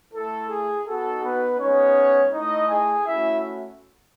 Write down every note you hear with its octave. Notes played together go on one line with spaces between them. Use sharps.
A3 E4 A4
G#4
B3 D#4 F#4 A4
B3 B4
G#3 B3 C#4 D#4 C#5
A3 D#4 E4 D#5
G#4 G#5
A3 C#4 E4 F#4 E5